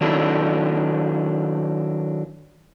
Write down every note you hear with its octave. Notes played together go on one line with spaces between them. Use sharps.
D#3 F#3 D4 E4 A4